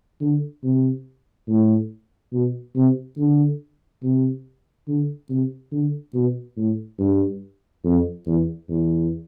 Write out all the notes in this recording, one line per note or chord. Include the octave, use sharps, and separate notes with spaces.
D3
C3
A2
B2
C3
D3
C3
D3
C3
D3
B2
A2
G2
F2
E2
E2